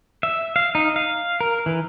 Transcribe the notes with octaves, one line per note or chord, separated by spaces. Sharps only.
E5
F5
D#4
F5
A#4
E3